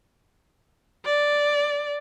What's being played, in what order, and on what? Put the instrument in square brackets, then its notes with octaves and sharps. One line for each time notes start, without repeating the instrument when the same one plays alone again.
[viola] D5